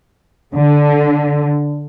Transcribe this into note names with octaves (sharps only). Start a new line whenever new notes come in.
D3